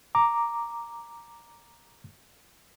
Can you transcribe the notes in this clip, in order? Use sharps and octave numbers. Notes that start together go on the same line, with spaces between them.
A#5 D6